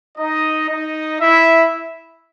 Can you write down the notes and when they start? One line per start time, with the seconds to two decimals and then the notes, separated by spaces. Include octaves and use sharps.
0.18 D#4 D#5
0.69 D#4 D#5
1.20 E4 E5